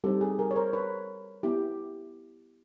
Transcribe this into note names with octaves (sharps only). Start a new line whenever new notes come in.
G3 C4 D#4 G4 A4
G#4
G#4 A#4
C#5
A#4 C5
B4 C#5
B3 E4 G4